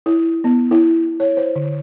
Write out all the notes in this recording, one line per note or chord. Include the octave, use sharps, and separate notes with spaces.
E4
B3
E4
C#5
C5
D3